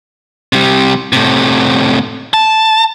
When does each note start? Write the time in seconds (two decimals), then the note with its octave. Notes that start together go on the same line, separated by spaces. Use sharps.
0.53 C3 G3
1.13 A2 C3
2.34 A5